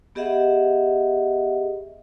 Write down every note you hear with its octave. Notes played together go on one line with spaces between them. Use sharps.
B3 G4 G#4 D#5 E5 F#5